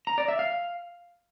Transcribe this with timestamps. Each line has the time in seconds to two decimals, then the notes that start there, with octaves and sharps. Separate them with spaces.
0.07 A#5
0.18 D5
0.28 E5
0.39 F5